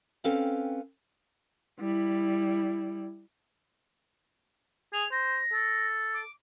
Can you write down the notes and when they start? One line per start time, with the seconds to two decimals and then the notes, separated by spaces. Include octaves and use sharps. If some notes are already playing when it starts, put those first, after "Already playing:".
0.24 C4 C#4 A4 B4 F5 G5
1.80 G3 E4
4.93 G#4 F7
5.11 C5 A#6
5.53 A4
6.13 D6